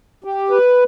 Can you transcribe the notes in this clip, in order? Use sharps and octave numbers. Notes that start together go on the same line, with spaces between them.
G4
B4